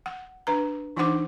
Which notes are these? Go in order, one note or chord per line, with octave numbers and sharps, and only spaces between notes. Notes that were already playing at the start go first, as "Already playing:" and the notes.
F#5
D4 B4 A#5
E3 D4 D#4 C5 F#5 D6